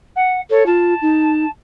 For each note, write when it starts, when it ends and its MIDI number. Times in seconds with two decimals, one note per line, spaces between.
0.16 0.40 78
0.50 0.64 69
0.50 0.66 73
0.66 0.94 65
0.66 1.48 81
1.02 1.45 63